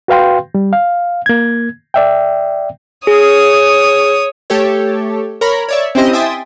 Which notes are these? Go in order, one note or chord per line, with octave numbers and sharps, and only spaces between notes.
F#4 B4 F5 G5 C6
G3
F5
A#3 G#6
D5 E5 G5
G#4 C#5 D#6
A3 G4 A4 C#5
A#4 C#5 A#5 B5
C#5 D5 E5
C4 C#4 E4 G4 C5 D#5
E5 G5 G#5 C6 D#6 A6